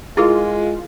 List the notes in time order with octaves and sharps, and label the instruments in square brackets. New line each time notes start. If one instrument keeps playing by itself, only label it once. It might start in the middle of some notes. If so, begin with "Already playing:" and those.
[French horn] G#3 [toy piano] E4 G#4 A#4 [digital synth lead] F4